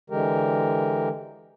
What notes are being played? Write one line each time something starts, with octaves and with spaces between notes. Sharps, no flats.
D3 E3 G#3 G4 A#4